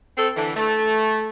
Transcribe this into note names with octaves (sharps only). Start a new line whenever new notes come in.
C4 A4
D3 E3
A3